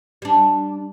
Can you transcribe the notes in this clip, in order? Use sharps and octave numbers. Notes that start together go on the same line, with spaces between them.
G3 D4